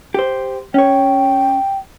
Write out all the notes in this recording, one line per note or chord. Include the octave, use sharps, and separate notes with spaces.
G4 C5
C#4 C#5 G5